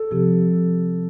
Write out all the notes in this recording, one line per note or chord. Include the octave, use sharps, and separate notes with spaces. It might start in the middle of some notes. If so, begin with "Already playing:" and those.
Already playing: A4
C3 F3 C4 G4